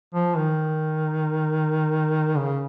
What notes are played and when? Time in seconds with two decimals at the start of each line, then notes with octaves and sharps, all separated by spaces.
0.14 F3
0.37 D#3
2.37 C#3